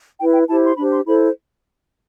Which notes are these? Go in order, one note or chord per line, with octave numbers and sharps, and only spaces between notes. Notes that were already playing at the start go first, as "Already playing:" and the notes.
E4 B4 G5
G5
E4 G4 C5 A5
C6
D4 G4 C5 B5
C6
E4 A4 C5 B5